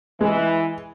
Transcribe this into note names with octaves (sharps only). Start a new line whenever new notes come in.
E3 G#3